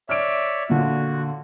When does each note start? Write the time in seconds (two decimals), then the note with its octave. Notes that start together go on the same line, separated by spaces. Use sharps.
0.09 C#5 D5 E5 F6 D7
0.70 A#2 D3 F4 F#4